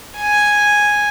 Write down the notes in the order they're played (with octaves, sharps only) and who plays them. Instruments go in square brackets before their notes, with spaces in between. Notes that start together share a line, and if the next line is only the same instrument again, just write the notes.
[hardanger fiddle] G#5